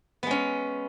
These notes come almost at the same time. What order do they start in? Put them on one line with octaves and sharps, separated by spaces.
B3 G#3 C#4